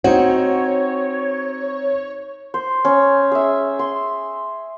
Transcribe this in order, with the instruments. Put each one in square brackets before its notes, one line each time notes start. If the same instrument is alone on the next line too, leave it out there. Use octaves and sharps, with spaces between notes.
[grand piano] C4 D#4 [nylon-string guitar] F#4 [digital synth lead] C#5
[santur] C5
C#4
G#4 E5
C6